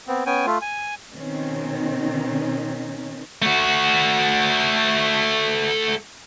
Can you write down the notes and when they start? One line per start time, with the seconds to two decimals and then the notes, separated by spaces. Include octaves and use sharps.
0.08 B3 C4
0.26 B3 C#4 G5 G#5
0.46 A3 F4
0.62 G#5
1.14 B2 D#3 C4 C#4 D#4
3.42 A3 F#4